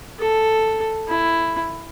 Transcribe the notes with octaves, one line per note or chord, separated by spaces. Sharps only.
A4
E4